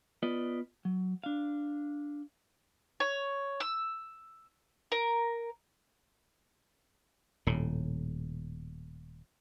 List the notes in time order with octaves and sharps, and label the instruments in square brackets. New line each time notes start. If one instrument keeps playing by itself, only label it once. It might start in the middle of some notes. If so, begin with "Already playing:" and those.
[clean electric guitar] B3 F4 B4 D5 D#5
F#3
D4 F5
[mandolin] C#5
E6
A#4
[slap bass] D#1 A2